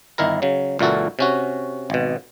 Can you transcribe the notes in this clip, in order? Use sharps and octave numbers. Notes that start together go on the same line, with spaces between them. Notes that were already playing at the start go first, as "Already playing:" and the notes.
G1 D#3 E4 A#4 A#5
C#3 F#3
C#2 A#2 E3 F#4 A4
C3 C#4 F#4
G#1 B2